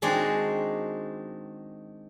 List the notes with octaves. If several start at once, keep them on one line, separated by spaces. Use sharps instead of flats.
D#3 G#3 C4 D4 F#4 G#4